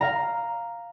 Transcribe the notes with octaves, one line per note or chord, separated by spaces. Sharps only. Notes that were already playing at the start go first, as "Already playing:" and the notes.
F5 A#5